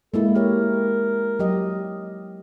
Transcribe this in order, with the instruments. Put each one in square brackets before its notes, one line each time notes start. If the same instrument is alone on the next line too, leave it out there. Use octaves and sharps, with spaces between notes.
[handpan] G#3 A#3 E4 [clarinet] A4
[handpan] A#3 G4 C#5 [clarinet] A#4
[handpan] F#3 G4 D#5